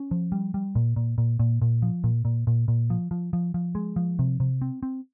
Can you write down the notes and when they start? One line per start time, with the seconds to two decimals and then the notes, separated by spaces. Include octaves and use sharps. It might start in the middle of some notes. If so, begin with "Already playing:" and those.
Already playing: C#4
0.11 F3
0.32 G3
0.54 G3
0.75 A#2
0.96 A#2
1.18 A#2
1.39 A#2
1.62 A#2
1.82 F3
2.04 A#2
2.25 A#2
2.47 A#2
2.68 A#2
2.90 F3
3.11 F3
3.33 F3
3.54 F3
3.75 G#3
3.96 F3
4.19 C3
4.40 C3
4.62 C4
4.83 C4